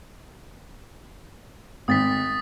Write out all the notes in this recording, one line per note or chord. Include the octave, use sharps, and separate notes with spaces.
G#1 D#6 A6 B6